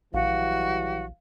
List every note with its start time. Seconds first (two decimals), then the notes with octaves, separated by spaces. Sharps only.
0.14 A#1 E3 F#3 G3 F#4 F5